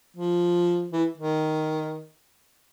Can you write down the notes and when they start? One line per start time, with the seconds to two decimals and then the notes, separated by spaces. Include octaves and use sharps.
0.17 F3
0.92 E3
1.18 D#3